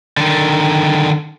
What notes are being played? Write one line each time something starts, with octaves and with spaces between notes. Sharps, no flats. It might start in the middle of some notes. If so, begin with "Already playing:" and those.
D3 D#3